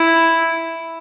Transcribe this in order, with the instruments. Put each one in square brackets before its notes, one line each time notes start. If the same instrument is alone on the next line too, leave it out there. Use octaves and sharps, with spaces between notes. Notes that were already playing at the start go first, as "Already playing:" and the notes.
Already playing: [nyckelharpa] E4